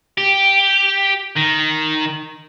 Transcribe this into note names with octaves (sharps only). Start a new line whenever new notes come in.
G4
D#3